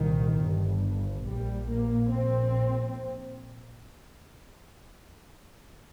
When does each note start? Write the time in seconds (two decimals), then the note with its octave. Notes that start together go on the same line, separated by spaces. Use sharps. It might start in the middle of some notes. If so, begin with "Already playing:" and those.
Already playing: C2 A#2 D#3
0.36 G1 G2
1.24 A#1 A#2 G3
1.69 A#3
2.13 A#1 A#2 C4